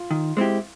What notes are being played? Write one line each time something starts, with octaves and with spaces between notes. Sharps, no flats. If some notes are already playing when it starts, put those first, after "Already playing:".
Already playing: F4
D#3
G#3 C4 E4 G4